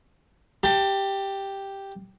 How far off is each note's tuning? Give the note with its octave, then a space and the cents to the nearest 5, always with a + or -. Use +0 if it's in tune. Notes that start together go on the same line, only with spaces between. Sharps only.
G4 +0 A5 +25